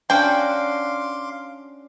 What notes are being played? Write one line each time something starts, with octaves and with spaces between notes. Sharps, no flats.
C#4 D4 F#4 F5 G5 C6 D6